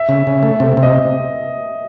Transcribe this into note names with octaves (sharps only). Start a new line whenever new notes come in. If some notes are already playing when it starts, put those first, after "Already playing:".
Already playing: E5
C#3
C#3
A3
C3
C3
D#5